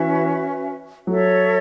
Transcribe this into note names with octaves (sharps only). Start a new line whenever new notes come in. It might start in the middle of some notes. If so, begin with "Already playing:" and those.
Already playing: E3 C#4 F#4 B4 E5
F#3 A4 C#5 E5